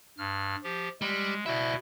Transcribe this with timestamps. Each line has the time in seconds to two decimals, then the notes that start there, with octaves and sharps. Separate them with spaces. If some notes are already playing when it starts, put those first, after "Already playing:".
0.18 G2 F6
0.63 F3 G4
1.02 G3 G#3
1.46 B2 E4 D5 E5